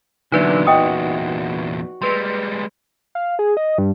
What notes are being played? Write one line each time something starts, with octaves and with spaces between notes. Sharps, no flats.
E2 A#2 D3 F#3 D#4 E4 B4 D5
F#4 D#5 G5 D#6
G3 G#3 B4 C6
F5
G#4
D#5
G2